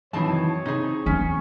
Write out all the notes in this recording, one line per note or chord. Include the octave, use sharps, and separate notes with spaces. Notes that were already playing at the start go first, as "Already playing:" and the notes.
F#2 D#3 E3 C4 G#4 C#5 A5
C3 D#4 G#4
E2 C#4 C#6